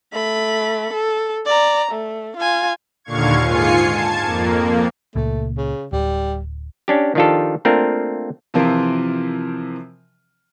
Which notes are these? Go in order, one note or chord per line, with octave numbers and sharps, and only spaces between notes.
A3 B5
A4
D5 A#5
A3
F4 G#5
D#2 A#2 D3 F5 C#6 G#6
G#2 F4 G#5 C7 C#7
A5 G#6
F2 A#3
C#2 A#2 A3
C#3
D1 G3
C#4 D4 G4
D#3 F3 D4 F4 G4 A4
A3 A#3 C4 D4 F4 A#4
C3 E3 F3 C4 F4 A#4